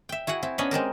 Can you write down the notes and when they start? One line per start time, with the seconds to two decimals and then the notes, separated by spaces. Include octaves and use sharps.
0.09 E5 G5
0.27 E4 F#4 G#4 F#5
0.43 C4 E4
0.58 B3 C#4 D4 C#5 D#5 B5
0.71 G#3 C4 G4 A#4